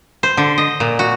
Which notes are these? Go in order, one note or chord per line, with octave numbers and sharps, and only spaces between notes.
C5
D3
D#5
A#2
F#4